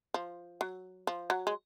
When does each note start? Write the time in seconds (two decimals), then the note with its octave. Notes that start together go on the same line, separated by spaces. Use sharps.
0.14 F3
0.61 F#3
1.07 F3
1.30 F#3
1.47 G#3